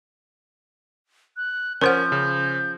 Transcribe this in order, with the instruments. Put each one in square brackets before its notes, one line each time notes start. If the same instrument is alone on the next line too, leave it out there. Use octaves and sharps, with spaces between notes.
[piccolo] F#6
[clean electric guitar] F3 [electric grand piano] C#4 [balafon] A#4 C5 F#5 [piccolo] G6
[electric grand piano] C#3